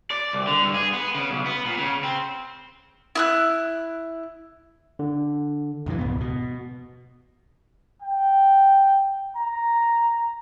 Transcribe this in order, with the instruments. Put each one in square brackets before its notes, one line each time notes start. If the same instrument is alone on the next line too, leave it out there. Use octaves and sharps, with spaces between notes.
[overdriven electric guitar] D5
C2
D3
G2
G#4
B3
C#3
B1
B3
A#2
C#3
C4
[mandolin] E4 E6 F#6
[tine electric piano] D3
[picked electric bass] B1 F2 D3 E3
D#1 C#2 G#2 B3
B2
[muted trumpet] G5
A#5